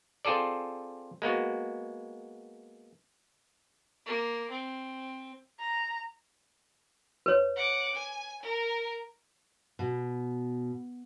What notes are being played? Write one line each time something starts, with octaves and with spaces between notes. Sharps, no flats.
C4 F4 G#4 A4 D5
G#3 A#3 B3 F#4
A#3
C4
A#5
B4 C#5
F#5 D6
G#5
A#4
B2